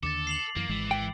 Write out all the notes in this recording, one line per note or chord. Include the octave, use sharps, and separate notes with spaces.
D#2 D3 A4 D6 A6
C7 F7 F#7
F#2 E3 A#3
G#1 E3 G#3
G5